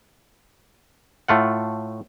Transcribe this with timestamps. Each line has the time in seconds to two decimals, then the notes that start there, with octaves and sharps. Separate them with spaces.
1.28 A2 A3 F4 F#5